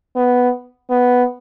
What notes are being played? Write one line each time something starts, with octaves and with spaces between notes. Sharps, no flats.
B3
B3